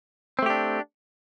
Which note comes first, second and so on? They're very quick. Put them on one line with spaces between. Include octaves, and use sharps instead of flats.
C4 A3 G4 D4